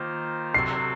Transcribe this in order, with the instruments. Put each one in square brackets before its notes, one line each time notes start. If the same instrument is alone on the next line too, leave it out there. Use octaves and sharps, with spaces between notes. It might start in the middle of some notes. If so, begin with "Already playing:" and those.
Already playing: [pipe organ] D#3 A#3 F4 C5
[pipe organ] C3 F#3 C4 F#4 A4 [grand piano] C7